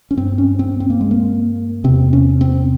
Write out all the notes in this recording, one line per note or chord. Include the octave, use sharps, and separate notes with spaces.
C#4
G2 C4
C#4
C4
C4
A#3
G#3
A#3
E2 C3 C4
C#4
C4